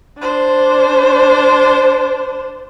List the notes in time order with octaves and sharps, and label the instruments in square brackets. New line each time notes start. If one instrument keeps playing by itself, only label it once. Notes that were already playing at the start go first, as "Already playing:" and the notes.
[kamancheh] D4 C5